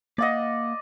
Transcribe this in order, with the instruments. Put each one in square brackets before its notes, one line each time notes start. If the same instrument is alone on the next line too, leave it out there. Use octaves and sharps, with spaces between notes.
[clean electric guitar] A#3 F5 F#5 [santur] D5 D#5